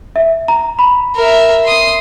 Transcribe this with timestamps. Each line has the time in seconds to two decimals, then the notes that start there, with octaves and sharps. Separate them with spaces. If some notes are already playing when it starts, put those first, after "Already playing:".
0.16 E5
0.48 A#5
0.79 A#5 B5
1.16 A#4 E5
1.65 C6 D#6